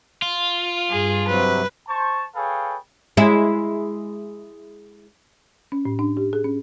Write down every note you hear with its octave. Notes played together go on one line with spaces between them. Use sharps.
F4
G2 G#4
C3 F#3 B4
C5 A5 C#6
G#4 A4 B4 C#5 F5 G5
G#3 E4
C#4
A2
D4
G4
G#4
C#4